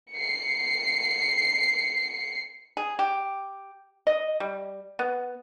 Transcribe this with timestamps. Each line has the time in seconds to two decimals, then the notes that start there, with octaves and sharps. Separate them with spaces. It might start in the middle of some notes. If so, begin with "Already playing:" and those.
0.12 C7 C#7
2.77 G#4
2.99 G4
4.07 D#5
4.40 G3
4.99 B3